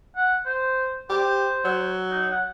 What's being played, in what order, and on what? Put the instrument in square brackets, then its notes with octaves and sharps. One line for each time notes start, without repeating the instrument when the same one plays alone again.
[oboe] F#5
C5
[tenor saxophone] G4 [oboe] C5
[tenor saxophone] F#3
[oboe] D#4
F#5